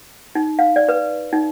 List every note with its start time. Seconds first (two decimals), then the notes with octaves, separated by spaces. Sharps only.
0.35 D#4
0.59 F5
0.76 D5
0.89 B4
1.33 D#4